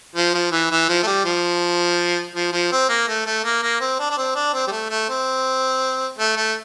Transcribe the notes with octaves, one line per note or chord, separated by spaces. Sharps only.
F3
F3
E3
E3
F3
A3
G3
F3
F3
F3
C4
A#3
A3
A3
A#3
A#3
C4
D4
D4
C4
D4
C4
G3
A3
A3
C4
A3
A3